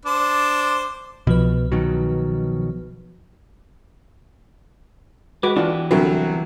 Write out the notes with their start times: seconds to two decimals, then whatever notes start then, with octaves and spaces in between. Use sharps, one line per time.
0.05 D4 C5 D6
1.27 C2 B2 F3 B4
1.72 B2 D#3 F#3
5.43 G#3 F#4 B4 D6
5.57 E3 B3 D4 F4 G4
5.91 C2 D3 F#3 B4